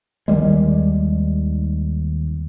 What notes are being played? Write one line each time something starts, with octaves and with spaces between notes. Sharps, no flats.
D#2 D#3 G3 G#3